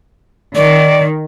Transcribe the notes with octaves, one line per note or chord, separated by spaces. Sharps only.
D#3 D5